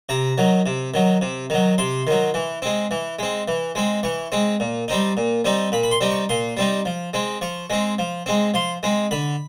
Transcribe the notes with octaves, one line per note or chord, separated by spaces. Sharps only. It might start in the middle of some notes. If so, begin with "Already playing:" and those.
C3 A#5
D#3 F#3
C3
D#3 F#3
C3
D#3 F#3
C3 C6
D#3 F#3
E3
G#3 C4
E3
G#3 C4
E3
G#3 C4
E3 C#6
G#3 C4
A#2
G3 C4 D#4
A#2
G3 C4 D#4
A#2 B5
B5
C6
G3 C4 D#4
C#6
A#2 C6
G3 C4 D#4
F3
G#3 C4
F3 C#6
G#3 C4
F3
G#3 C4
F3 C6
G#3 C4
D3 B5